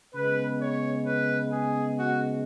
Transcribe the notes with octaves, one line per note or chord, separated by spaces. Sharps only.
C#3 G#3 B3 B4
C#5
B4
G#4
F#4